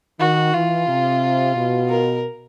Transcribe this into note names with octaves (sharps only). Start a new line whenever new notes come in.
D#3 F#4
E3 F4
C3
B2
A#4